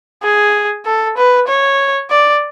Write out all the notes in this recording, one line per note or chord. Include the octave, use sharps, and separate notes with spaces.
G#4
A4
B4
C#5
D5